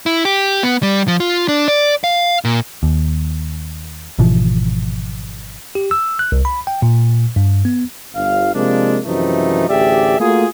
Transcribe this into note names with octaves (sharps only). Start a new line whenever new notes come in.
E4
G4
B3
G3
F3
F4
D4
D5
F5
A#2
D#2
G#1 B2 E3 F3
G4
E6
F#6
C2
B5
G5
A#2
G2
B3
G1 F5
C3 F3 G#3 A#3 D4
F#2 C3 E3 F3 A3 D#4
A1 D2 G4 G#4 D5 E5
A3 A#3 F4 F#4 G#4